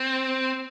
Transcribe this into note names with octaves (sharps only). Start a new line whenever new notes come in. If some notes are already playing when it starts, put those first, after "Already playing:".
Already playing: C4